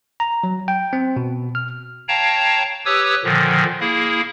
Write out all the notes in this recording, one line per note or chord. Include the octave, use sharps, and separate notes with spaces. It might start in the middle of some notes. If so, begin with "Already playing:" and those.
A#5
F#3
G5
C4
B2
F6
C#5 F5 G5 A5 A#5
G4 B4 C#5 D#6 E6
A#2 D3 D#3 F3
A#3 E4 G#4